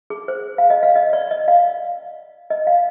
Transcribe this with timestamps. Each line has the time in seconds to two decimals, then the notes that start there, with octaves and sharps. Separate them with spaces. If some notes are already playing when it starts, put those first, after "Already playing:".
0.10 G#4
0.28 C5
0.58 F5
0.70 D#5
0.83 F5
0.96 D#5
1.13 D5
1.31 D#5
1.48 F5
2.50 D#5
2.67 F5